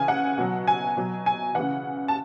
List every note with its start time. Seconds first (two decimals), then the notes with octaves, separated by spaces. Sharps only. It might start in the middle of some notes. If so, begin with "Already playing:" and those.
Already playing: C#3 E3 G#5
0.08 F#5
0.38 B2 F#3
0.67 G#5
0.97 B2 F#3
1.26 G#5
1.55 C#3 E3 F#5
2.08 A5